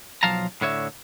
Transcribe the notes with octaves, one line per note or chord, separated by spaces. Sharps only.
B1 F3 F#3 F5 A5 A#5
A2 D3 C#5 E5